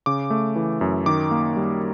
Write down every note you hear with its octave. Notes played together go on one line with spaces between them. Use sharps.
C#3 D6
A3
E3
F#2
D#3 D6
A#3
G3